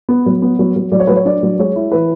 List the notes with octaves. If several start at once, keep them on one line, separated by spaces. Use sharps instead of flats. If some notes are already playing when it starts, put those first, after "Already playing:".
B3
F#3
B3
F#3
F#3
F#3 D5
C#5
F#3 B4
C#5
D4 D5
F#3
G#3 C#5
E4
E3 B4